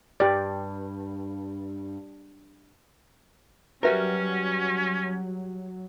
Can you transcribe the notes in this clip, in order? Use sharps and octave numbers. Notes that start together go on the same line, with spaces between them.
G2 G4 D5
F#3 G3 C#4 F#4 A#4 B4 E5